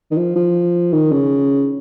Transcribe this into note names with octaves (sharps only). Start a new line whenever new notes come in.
D#3
F3
F3
D#3
C#3